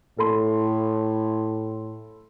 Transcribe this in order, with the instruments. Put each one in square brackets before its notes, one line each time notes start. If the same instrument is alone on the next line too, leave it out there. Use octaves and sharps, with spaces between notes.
[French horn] A2 [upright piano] A4 B5 C6